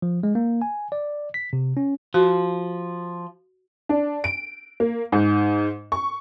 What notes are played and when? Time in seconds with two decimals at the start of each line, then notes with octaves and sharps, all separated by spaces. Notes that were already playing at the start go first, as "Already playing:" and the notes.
0.02 F3
0.23 G#3
0.35 A#3
0.62 G#5
0.92 D5
1.34 B6
1.53 C3
1.77 C#4
2.14 F3 F#4
3.89 D4
4.24 D7
4.80 A#3
5.12 G#2
5.92 C#6